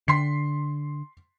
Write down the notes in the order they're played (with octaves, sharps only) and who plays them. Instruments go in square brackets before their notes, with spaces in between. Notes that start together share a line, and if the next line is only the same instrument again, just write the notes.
[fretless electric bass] D3 [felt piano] C6 B6 C7